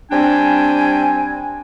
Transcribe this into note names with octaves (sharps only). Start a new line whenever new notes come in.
G3 C4 D4 G5 G#5